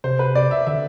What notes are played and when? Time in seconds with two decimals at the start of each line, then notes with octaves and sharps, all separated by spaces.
0.04 C3 C5
0.19 B4
0.35 D5
0.51 E5
0.67 D3 E5